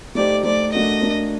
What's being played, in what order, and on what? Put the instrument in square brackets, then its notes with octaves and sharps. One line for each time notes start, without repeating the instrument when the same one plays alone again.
[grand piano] A3 D#4 G4 C5 [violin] D5
[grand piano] A3 D#4 G4 C5 [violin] D5
[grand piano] A3 D4 F#4 A#4 [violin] D#5
[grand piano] A3 D4 F#4 A#4